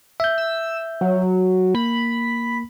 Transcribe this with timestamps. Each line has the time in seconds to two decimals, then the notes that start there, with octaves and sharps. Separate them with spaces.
0.20 E5 G6
0.38 E6
1.01 F#3
1.75 A#3 B5